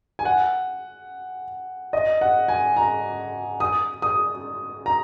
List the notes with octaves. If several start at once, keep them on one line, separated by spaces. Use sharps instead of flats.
G#5
F#5
D#5
F#5
G#5
A#5
D#6
D#6
A#5